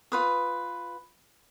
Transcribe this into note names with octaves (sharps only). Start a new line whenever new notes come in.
F4 B4 D#6